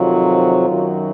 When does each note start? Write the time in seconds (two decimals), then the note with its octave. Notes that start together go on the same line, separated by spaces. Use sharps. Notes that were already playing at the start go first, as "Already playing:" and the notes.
Already playing: F2 C3 D#3 F#3 F4
0.66 F#2 D#3 F#3